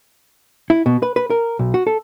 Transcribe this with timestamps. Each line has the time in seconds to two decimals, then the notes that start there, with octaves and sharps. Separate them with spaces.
0.70 E4
0.86 B2
1.03 B4
1.16 B4
1.30 A#4
1.59 B1
1.74 F#4
1.87 A4